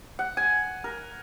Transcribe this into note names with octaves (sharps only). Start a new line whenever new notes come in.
F#5
G#5
A#4